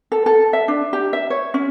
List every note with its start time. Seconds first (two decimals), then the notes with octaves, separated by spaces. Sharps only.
0.12 A4
0.26 A4
0.53 E5
0.68 D4
0.93 G4
1.13 E5
1.30 C#5
1.54 C#4